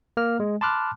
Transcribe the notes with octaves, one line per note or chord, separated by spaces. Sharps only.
A#3 F6
G#3
A5 B5 C6 D6 F6 F#6